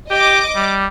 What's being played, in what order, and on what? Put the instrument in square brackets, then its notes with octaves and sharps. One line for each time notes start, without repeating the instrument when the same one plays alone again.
[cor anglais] G4 [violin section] D#5 D6
[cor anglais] G3